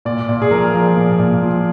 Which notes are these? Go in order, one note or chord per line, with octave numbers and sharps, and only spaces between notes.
A#2 D5
A#2
G#4
F3 A#4
F3
A#2
A#2
F3